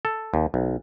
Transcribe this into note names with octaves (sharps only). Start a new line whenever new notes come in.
A4
D#2
B1